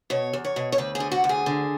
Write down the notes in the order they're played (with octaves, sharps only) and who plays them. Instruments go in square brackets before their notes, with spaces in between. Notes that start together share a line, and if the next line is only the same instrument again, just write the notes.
[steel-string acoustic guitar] B2 C#5
E2
C#5
B2
C#5
D2 B4
G#4
D3
F#4
D2
G#4
D3